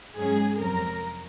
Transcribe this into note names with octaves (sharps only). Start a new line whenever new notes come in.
G#2 F#3 C#4 G#4
F2 C3 F#3 C4 A#4